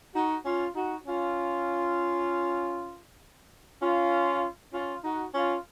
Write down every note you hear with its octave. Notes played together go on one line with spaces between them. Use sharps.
D#4 F#4
C#4 F4
D#4 F#4
C#4 F4
C#4 F4
C#4 F4
D#4 F#4
C#4 F4